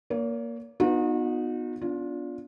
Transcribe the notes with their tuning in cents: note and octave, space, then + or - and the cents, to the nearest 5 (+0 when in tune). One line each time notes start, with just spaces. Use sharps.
A#3 +5 C#5 +40
B3 +0 D#4 -10 F#4 -40
B3 +0 D4 -20 F4 +15